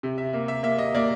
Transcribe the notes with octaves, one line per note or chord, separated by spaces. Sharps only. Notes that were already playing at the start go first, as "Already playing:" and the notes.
C3
E5
A#3 E5
E5
A#3 E5
D#5
A#3 D5